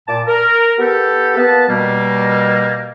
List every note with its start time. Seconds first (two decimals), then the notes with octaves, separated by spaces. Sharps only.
0.08 A#2 A5 D6
0.27 A#4
0.79 B3 G4 A4
1.36 A#3 B3 B4 A5
1.68 B2 G3 A#3